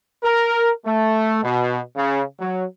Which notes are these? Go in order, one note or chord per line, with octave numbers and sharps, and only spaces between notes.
A#4
A3
B2
C#3
F#3